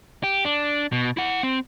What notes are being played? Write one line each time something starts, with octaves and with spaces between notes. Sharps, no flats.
G4
D4
B2
E4 F#5
C4